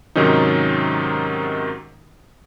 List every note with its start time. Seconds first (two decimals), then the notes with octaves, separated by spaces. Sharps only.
0.16 G#2 C3 D#3 F#3 C#4 D#4